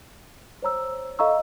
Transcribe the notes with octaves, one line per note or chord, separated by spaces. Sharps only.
C5 C#5 A#5 E6
A4 D#5 F5 A#5 C#6 E6